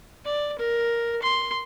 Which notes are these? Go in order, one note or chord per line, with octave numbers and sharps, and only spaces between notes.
D5
A#4
C6